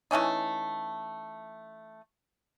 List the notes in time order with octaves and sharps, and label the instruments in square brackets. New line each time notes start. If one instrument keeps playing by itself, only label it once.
[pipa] E3 A3 C#4 D#4